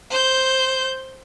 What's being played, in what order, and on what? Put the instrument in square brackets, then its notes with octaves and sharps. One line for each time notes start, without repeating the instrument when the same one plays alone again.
[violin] C5 G6